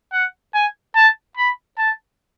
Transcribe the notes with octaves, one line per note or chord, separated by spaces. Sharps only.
F#5
G#5
A5
B5
A5